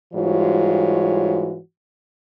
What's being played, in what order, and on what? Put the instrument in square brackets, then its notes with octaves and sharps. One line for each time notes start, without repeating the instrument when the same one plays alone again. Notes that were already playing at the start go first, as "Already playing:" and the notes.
[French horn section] G#2 E3 G3 F4 F#4 C#5